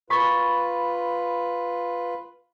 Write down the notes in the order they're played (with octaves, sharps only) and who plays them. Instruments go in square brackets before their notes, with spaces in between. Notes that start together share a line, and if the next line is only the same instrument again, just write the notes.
[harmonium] F4 B4 [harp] B5 C#6 A6